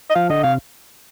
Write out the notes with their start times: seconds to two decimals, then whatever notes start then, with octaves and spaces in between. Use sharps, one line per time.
0.10 D#5
0.15 F3 F5
0.30 D3 D#5
0.43 C3 F5